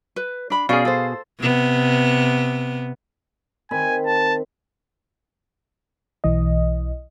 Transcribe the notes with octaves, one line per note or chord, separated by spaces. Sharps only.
B4
D4 B5
B2 C#4 G#4 D5 F5
A4 C5
C3 B3
D#3 C4 G#5 B5
A5
B1 E3 D#5